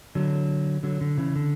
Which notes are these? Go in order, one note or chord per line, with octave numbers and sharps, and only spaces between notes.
D3 F#3
D3 F#3
D3
C#3 E3
D3